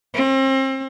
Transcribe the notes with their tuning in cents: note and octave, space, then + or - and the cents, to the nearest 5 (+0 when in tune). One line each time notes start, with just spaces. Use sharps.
C4 +35